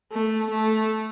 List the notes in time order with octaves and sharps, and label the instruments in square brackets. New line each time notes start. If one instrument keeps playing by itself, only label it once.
[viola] A3
A3